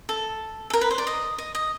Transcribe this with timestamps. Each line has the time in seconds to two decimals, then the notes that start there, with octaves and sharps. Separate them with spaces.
0.09 A4
0.70 A4
0.73 A#4
0.81 B4
0.91 C5
0.98 D5
1.07 D#5
1.38 D#5
1.55 D#5